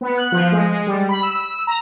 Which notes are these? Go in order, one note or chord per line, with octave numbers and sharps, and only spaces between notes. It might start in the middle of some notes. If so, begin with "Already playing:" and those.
B3
F#6
F3
G#3
G#3
G3
B5
E6
A#5